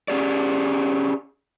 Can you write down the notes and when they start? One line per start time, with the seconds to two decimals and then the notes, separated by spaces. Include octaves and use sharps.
0.08 C#4 G4 G#4 D5